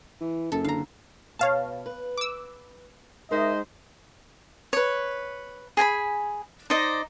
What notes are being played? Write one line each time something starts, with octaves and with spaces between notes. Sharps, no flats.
E3
F#1 F#2 A4
D3 F5 A#5
B2 C#5 F5 A5
B4
D6 E6
G#2 A#4 C5 D#5 E5
B4 C#5
G#4 G#5 A#5 B5
D#4 C5 D5 D#5